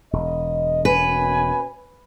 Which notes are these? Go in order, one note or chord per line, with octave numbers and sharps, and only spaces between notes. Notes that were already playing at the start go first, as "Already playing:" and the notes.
E1 D#5
B2 A#3 C#4 B4 G#5